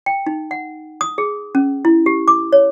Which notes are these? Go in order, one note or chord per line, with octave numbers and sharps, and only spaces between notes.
G5
D#4
F#5
D#6
G#4
C#4
E4
G4
D6
C#5